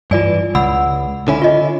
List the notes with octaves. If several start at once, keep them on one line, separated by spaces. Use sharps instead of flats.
G2 E3 F4 D5 G#5
C#2 F#5 B5 E6
D3 C#4 E4
F4 D#5